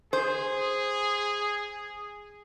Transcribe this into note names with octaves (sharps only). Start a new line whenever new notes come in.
G#4 C5